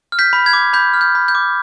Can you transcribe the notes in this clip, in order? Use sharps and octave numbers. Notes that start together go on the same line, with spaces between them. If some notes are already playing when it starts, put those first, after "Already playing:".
F6
G6 B6
B5
G#6
D6
B5 G6
F6
G6
B5
G6
D6